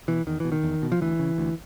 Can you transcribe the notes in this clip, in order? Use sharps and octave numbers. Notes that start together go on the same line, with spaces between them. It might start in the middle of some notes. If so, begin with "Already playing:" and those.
B2 E3
E2 D#3
B2 E3
D#3
E2
B2
F3
D2 E3
C#3
D2